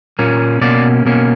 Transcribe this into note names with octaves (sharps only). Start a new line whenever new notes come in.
A#2 A#3 C#4
B2 A#3 C#4 D5
B2 A#3 C#4